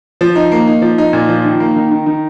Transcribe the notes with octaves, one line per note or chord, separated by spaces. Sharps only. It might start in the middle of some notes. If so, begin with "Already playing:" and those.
F3
D#4
A#3
D#4
F3
D#4
A#2
F3
D#3
A#3
D#3
D#3
D#3